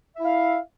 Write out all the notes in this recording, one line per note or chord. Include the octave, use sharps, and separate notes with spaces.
E4 E5 F5